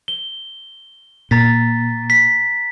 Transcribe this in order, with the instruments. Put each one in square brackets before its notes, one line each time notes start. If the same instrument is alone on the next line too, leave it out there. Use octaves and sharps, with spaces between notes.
[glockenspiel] G7
[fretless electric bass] A#2 [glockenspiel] A#5 A6 B6
[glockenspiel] B6